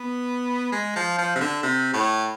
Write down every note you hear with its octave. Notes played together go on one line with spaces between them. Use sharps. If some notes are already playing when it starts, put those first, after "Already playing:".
Already playing: B3
G#3
F3
F3
C3
D3
C3
A2